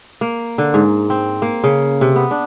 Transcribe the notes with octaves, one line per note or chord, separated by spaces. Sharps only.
A#3
D3
G#2
C4
A#3
C#3
C3
B3
D4